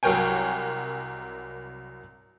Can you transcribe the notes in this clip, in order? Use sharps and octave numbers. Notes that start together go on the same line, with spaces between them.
C2 F#3 A#4 C#5 G5 G#5